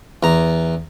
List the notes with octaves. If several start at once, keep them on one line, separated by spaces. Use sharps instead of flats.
E2 A#5